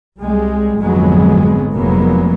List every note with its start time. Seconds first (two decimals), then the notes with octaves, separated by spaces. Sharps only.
0.19 C2 G3 G#3
0.81 G#1 F2 D3 F#3 G#3 B3
1.73 F1 F2 F#3 G#3 A#3 B3